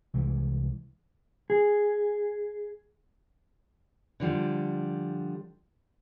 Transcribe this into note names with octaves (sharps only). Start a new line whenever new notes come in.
C2 E3 G#3
G#4
D3 F3 G3